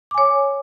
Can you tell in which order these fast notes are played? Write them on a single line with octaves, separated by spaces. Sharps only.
D6 G#5 C#5